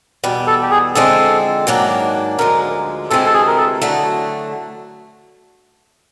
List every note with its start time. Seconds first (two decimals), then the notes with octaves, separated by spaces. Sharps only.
0.24 E2 B2 G3
0.47 A4
0.63 G4
0.71 G#4
0.95 D3 F3 G#3 C4 A4
1.67 G#2 D#3 F#3 A#3 D4
2.39 D2 D3 F3 G#3 A#4
3.10 D2 C3 E3 G#3 C4 A4
3.26 A4
3.34 G#4
3.47 A#4
3.57 A4
3.82 D3 F#3 A3